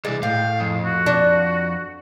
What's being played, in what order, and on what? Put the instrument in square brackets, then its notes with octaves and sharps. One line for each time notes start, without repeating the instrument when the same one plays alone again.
[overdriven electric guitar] C2 E3 [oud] G#3 [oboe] D5
[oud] A2 [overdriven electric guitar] F5 [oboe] G5
[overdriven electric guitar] F2 [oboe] G#4
[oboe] F#4
[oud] D4